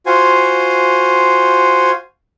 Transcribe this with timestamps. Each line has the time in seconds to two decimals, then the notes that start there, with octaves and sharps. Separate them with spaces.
0.06 F4 F#4 C5 G#5